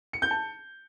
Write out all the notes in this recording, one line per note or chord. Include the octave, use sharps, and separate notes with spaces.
C#7
G6
A5